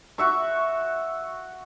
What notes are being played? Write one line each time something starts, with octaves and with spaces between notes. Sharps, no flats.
F#4 E5 C#6